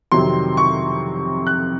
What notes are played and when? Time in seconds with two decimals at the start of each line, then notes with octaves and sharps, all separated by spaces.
0.12 F2 C3 D#3 F#3 C6
0.57 C#6
1.47 F#6